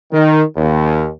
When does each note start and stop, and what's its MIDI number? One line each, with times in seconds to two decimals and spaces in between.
0.12 0.41 51
0.55 1.08 39